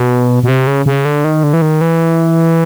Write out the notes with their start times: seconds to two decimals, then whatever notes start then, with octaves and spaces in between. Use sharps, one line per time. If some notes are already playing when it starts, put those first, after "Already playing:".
Already playing: B2
0.43 B2
0.48 C3
0.67 C#3
0.86 C#3
1.05 D3
1.24 D#3
1.43 D3
1.53 E3
1.62 D#3
1.81 E3